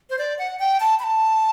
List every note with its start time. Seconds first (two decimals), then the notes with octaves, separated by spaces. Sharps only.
0.10 C5
0.19 D5
0.39 F#5
0.59 G5
0.80 A5
0.99 B5
1.04 A5